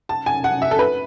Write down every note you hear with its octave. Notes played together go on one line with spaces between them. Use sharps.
A5
G#5
F#5
E5
A4
B4